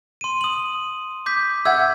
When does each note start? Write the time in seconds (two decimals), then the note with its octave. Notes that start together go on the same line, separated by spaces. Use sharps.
0.21 C6 D#7
0.41 D#6 F#7
1.26 D6 G6 B6
1.65 E5 F#5 E6 G6 G#6